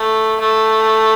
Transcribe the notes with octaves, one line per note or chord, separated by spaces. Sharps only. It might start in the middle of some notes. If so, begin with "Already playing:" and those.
Already playing: A3
A3